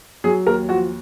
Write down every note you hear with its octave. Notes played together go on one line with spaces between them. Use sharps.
F#3 G#4
D#2 A#4
F3 F#4